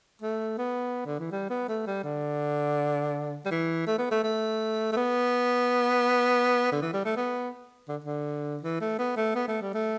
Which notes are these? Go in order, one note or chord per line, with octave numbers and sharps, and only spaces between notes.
A3
B3
D3
E3
G3
B3
A3
G3
D3
G3
E3
A3
B3
A3
A3
A3
B3
D3
E3
G3
A3
B3
D3
D3
E3
A3
B3
A3
B3
A3
G3
A3